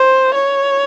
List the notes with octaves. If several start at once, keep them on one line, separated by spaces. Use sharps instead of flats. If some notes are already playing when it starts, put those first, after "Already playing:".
Already playing: C5
C#5